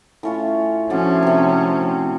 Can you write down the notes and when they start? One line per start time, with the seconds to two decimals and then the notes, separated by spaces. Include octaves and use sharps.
0.23 A2 C#4 F4
0.90 F3 A3 C#4 D4 F#4
1.22 C3 C4